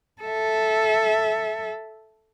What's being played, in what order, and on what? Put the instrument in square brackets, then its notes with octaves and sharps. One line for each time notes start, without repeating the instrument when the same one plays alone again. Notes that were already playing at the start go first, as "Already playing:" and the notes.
[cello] A4 E5